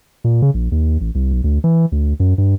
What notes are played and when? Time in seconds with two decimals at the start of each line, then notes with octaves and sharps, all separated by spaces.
0.24 A#2
0.42 C#3
0.54 A#1
0.72 D#2
1.01 A1
1.15 C2
1.32 B1
1.44 D2
1.64 E3
1.92 D2
2.20 F#2
2.38 G2